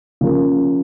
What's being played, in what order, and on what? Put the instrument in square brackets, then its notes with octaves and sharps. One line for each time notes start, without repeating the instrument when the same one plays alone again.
[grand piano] C#3 F3 A#3